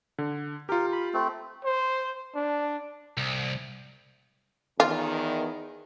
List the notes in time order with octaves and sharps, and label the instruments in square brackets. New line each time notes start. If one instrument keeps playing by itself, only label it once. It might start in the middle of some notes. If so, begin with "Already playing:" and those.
[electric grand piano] D3
[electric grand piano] F4 G4 [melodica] A#4
[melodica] B5
A3 C4
[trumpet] C5
D4
[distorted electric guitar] C2
[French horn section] E2 D#3 [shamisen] F4